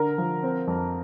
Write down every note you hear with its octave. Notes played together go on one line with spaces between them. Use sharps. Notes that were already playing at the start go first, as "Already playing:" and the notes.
Already playing: D3 A#4
F3
C4
F2